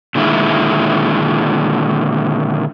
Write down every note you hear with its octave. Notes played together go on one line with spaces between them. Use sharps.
A#2 D3 D#3 G#3 E4